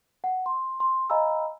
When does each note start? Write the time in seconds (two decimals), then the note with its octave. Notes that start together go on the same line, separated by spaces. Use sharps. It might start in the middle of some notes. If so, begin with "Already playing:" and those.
0.24 F#5
0.46 C6
0.80 C6
1.10 D#5 F5 G#5 A#5 B5 E6